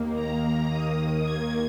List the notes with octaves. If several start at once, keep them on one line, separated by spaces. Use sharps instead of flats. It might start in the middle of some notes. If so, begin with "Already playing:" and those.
Already playing: D#2 D#3 A#3
A#5
D#6
G#6